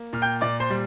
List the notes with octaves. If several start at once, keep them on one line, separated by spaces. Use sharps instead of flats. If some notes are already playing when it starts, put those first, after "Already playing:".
Already playing: A#3
A#2 F6
G5 G6
A#2 D5 D6
C5 C6
G3